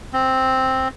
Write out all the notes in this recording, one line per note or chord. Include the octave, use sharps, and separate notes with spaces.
C4